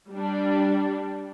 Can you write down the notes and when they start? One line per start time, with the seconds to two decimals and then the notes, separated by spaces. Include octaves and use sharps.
0.12 G3 D4